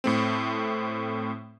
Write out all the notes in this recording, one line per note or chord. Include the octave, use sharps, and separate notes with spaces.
A2 A3 C4